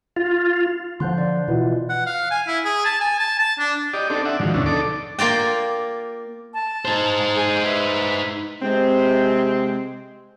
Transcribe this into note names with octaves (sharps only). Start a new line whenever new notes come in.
F4
D3 F3 C6 F#6 G6
D5
B2 E3 E4 F4
F#5
F5
G#5
E4
G#4
A5
G#5
A5
A5
D4
G4 D5 D#5
C4 D4 D#4 A4 D5
D5 E5 F#5
G#2 D3 D#3 F3 F#3
D2 B2 C#4 D4 E4
D#4 A4 D5 D6
A#3 F4 D5 G5
A5
D#4 C5
G#4 G5
B4 E5
C3 G#3 C4